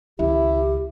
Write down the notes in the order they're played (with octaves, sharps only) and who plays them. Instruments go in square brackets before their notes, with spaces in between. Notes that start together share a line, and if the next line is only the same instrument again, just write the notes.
[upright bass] C#2 D#3 [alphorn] E4 [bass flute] G4